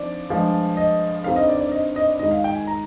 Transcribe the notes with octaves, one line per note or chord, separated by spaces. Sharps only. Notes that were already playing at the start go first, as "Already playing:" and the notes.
Already playing: D3 F3 C4 D#4 D5
G2 F3 G#3 D4
D#5
G2 D3 G3 C4 D#4 F5
D#5
D5
D5
D#5
D#5
D5
G#2 D#3 G#3 D#4 D#5
F5
G5
G#5
A#5